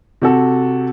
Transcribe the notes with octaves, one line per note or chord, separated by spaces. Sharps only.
C3 F#4 A4